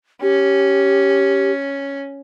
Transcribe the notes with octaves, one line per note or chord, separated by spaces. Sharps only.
C#4 G4